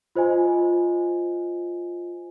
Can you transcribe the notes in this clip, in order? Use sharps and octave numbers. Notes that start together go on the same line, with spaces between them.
F4 C5 D#5 G#5